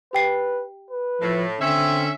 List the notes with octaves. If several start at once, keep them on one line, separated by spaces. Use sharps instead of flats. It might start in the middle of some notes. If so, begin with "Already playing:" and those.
G4 B4 G5 C7
B4
A2 F3
D3 C4 C#4 E5